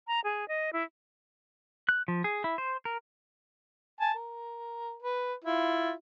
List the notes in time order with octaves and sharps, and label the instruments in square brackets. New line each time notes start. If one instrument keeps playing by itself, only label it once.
[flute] A#5
G#4
D#5
E4
[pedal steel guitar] F#6
F3
G#4
E4
C5
A#4
[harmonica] G#5 A5
A#4
B4
E4 F4